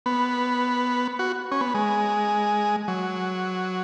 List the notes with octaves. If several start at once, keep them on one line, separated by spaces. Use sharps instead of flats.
B3
F#4
C#4
B3
G#3
F#3